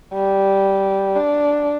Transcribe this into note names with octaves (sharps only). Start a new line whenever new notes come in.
G3
D4